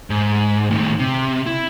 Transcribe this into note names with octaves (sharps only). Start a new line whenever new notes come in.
G#2
A2 D#3
C3
E4